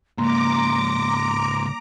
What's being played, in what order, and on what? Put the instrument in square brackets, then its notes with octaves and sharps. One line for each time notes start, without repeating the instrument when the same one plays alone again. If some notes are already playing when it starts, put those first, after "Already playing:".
[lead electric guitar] C#2 G#2 [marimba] A#3 [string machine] A#5 D6 [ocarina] C6